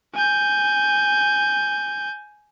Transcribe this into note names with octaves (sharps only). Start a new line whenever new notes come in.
G#5 G6